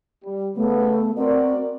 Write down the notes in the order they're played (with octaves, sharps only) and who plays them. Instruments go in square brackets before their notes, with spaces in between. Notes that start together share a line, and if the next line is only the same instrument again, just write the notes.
[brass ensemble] G3
[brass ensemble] C#3 B3 [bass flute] A3
[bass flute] C4 [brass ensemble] F#4 A#4 D5